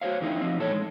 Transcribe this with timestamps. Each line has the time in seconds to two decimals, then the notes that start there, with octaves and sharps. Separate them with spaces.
0.01 F#4 G#4 C5 C#5 F5
0.21 F2 D3 F3 D#4 E4
0.40 F3 C4 D#4
0.58 E2 A#2 A4 C#5
0.71 G#3